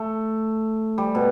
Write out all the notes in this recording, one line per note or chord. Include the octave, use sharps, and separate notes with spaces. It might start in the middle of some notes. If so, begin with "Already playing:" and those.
Already playing: A3
G3
B2